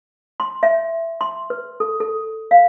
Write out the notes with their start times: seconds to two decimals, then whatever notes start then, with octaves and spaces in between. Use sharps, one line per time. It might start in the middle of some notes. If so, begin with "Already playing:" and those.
0.40 C6
0.63 E5
1.21 C6
1.50 B4
1.80 A4
2.00 A4
2.51 F5